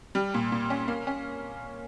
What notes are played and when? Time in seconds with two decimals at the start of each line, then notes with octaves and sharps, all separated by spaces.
0.15 G3
0.34 A#2
0.52 A#2
0.70 C#4
0.88 A#3
1.07 C#4